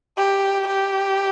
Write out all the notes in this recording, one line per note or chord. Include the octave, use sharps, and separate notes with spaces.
G4
G4